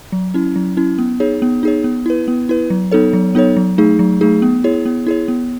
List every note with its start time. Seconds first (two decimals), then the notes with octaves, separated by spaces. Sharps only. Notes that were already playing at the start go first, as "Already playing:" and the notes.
0.12 F#3
0.34 C#4 E4
0.56 F#3
0.77 C#4 E4
0.99 B3
1.20 D#4 G#4 C#5
1.42 B3
1.63 D#4 G#4 C#5
1.84 B3
2.06 E4 B4
2.28 B3
2.49 E4 B4
2.70 F#3
2.91 B3 D#4 A4 C#5
3.13 F#3
3.35 B3 D#4 A4 C#5
3.57 F#3
3.78 A3 D#4 G#4
3.99 F#3
4.21 A3 D#4 G#4
4.42 B3
4.64 E4 G#4 C#5
4.86 B3
5.06 E4 G#4 C#5
5.28 B3